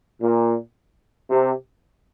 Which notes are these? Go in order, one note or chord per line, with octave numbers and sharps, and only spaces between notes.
A#2
C3